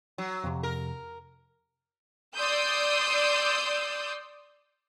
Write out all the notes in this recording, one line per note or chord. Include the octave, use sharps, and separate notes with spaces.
F#3
F2 C3
A#4
D5 C6 D#6 E6 G6